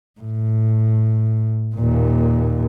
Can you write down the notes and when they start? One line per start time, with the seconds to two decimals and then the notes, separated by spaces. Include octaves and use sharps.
0.20 A2
1.76 D#2 A#2